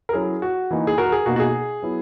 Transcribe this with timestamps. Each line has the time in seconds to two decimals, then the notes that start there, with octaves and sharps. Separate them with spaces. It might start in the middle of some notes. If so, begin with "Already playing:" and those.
0.09 A#4
0.13 F#3 C#4 E4 G#4
0.42 F#4
0.71 E3 A#3 D#4
0.87 G#4
0.98 F#4 A#4
1.12 G#4
1.26 B2 A#3 D#4 F#4
1.36 F#4
1.40 G#4
1.82 F#3 B3 E4